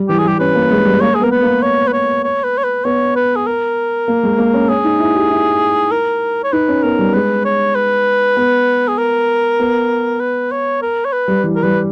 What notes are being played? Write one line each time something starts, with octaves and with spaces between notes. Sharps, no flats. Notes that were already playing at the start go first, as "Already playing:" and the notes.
Already playing: G3
E3 G4
G#4
G3
G4
C#4 B4
A#3
G#3
G3
A#3 C#5
G#4
B3 A#4
B4
A#3
C#5
B4
C#5
C#5
B4
C#5
B4
B3 C#5
B4
G#4
A#4
A#3
G#3
A#3
C#4
C#4 G#4
D#4
E4
G4
E4
A#4
C#5
D#4 B4
C#4
B3 A#4
G3
G#3 B4
C#5
B4
B3
G#4
A#4
B3
B4
C#5
A#4
C#5
B4
G3
E3
A#4
G3 B4